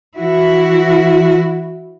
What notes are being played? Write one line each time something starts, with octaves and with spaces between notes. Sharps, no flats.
E3 E4 F#4